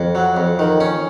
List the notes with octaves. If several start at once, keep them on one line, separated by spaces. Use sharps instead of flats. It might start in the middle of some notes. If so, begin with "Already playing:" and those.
Already playing: F2
F#3
F2
D#3
C#4